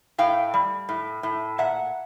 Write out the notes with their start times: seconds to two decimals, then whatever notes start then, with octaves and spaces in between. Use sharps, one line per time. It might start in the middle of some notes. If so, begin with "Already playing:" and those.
0.18 A2 F5 G5
0.54 G3
0.89 A2
1.23 A2
1.58 A#2 E5 F#5